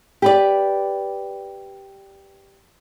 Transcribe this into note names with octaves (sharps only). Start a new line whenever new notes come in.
G4 B4 D5